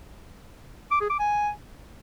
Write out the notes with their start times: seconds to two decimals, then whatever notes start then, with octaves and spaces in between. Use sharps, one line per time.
0.91 D6
1.00 G#4
1.10 D6
1.19 G#5